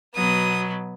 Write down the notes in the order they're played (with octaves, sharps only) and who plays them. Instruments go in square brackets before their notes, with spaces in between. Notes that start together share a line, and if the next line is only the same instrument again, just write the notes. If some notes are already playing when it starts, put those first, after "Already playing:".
[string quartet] B2 F#3 B3 D#6